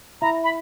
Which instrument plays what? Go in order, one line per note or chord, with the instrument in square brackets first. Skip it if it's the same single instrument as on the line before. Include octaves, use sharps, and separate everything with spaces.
[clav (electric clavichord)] E4 [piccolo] A#5
[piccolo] B5